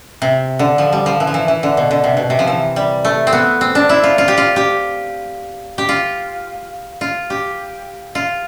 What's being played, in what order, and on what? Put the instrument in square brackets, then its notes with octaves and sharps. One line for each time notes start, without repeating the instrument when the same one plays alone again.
[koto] C3
D3
F3
G3
F3
E3
F3
E3
E3
D3
B2
D3
C3
B2
C3
F3
E3
G3
A3
C4
B3
C4
D4
E4
F4
F4
G4
F4
G4
G4
F4
F4
G4
F4